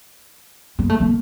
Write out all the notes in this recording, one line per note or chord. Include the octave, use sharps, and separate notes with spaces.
A#3
A3
A#3